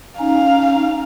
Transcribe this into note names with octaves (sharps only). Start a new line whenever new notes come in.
C#4 D#4 F5